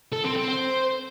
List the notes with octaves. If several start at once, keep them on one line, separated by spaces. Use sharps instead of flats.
A4
C4
C4
C5